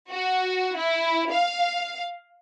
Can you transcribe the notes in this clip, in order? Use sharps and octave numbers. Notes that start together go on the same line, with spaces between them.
F#4
E4
F5